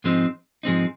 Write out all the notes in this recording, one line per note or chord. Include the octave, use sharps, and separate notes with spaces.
G#2 F3 G#3 C4 D#4
G#2 F3 G#3 C4 D#4